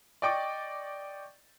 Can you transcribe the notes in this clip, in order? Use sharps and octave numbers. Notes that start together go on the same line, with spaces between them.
D5 D#5 G5 C#6 D6 A6